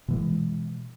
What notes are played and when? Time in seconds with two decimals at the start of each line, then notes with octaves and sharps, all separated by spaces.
0.08 B2 E3 G#3